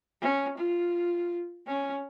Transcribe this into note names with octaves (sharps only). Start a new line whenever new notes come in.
C#4
F4
C#4